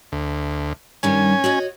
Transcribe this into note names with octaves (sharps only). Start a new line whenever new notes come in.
D2
G2 D#3 G3 C#4 G#5
F#4 C#5 D#5